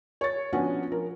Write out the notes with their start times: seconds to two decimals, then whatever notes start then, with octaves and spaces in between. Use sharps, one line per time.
0.21 C#5 A6
0.53 F3 B3 C#4 D4 F#4
0.91 F3 A#4